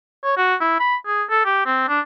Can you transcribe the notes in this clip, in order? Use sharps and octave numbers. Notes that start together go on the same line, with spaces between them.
C#5
F#4
E4
B5
G#4
A4
G4
C4
D4